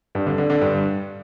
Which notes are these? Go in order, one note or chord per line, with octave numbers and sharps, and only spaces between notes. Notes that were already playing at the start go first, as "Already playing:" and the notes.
G2
D3
D3
D3
G2